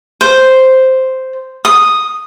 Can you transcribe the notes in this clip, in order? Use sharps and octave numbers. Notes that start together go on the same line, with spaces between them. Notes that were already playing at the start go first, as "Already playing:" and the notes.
C5
D#6